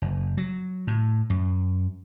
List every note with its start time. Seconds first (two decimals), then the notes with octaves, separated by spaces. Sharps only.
0.02 F#1
0.37 F#3
0.87 A2
1.30 F#2